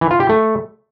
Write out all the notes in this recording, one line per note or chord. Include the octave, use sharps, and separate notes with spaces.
E3
F4
G4
A3